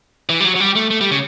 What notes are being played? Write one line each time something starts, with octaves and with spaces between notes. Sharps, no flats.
E3
G3
F#3
F#3
G3
A3
A3
G3
C#3